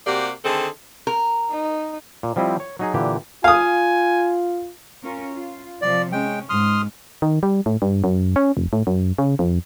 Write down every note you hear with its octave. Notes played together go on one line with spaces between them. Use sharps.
C3 A#3 F#4 G4 D5
D3 D#3 C4 G#4 A4
A#4
D#4
A#2
F3 G3 C4 E4 D#5
C#5
F#3 D#4 G#4
A#2 D3 E3 G4
F4 F5 G#5 D#6
C#4 F4 A#4
F4
C3 F3 D5
G#3 C#4 G5
G#2 C6 D#6 F6
D#3
G3
A2
G2
F#2
C#4
F1
A2
F#2
C#3
F2